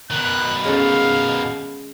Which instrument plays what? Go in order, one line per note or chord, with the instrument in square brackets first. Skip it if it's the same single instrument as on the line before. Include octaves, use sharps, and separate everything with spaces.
[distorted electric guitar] B2 D#3 [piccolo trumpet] F#6
[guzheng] G#3 C#4 A4 [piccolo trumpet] F5